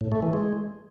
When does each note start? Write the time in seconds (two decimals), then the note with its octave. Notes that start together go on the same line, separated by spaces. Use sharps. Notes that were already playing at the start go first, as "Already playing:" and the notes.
0.01 A2
0.12 A3
0.22 E3
0.33 G#3